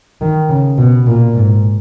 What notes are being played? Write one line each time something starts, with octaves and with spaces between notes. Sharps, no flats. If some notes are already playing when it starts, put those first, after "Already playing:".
D#3
C#3
B2
A#2
G#2